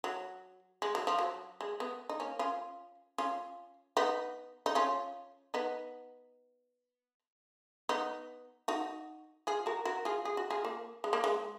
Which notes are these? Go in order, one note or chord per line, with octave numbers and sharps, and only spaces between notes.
F#3
G#3
F#3
F3
F#3
G#3
B3
D#4
A#3 C#4
C#4 F4
C#4 F4
B3 D#4
D#4
C#4 F4
B3 D#4
B3 D#4
D#4 F#4
F4 G#4
F#4 A#4
F#4 A#4
F4 G#4
G#4
F#4
F4 G#4
A#3
G#3
A#3
G#3